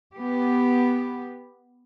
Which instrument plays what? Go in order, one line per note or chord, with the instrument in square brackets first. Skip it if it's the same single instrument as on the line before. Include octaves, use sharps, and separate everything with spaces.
[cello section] B3 G4